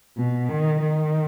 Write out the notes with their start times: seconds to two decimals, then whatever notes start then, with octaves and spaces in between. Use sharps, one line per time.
0.17 B2
0.49 D#3
0.81 D#3